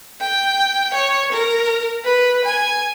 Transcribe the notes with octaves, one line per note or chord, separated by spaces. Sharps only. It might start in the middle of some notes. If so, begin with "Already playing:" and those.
G5
C#5
A#4
B4
G#5